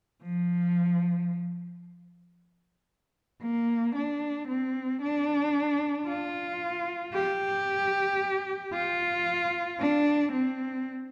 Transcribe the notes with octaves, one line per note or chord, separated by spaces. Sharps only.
F3
A#3
D4
C4
D4
F4
G4
F4
D4
C4